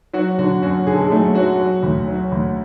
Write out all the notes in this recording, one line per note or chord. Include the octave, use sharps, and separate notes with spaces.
F#3 F#4
D3 F#3 F#4
F#2 F#3 F#4
D3 G#4
A4
G#3 G#4
F#3 A3 A4
F#3 F#4
F#3
D2
F#3
D2